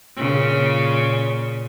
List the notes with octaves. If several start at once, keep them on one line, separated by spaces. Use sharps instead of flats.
A#2 C#3